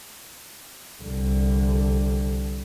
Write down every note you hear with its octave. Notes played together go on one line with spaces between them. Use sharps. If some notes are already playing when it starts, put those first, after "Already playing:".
C2 D3